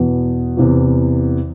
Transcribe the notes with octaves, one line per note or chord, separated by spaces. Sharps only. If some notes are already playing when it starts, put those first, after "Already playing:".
Already playing: E2 B2 B3
E2 C3 E3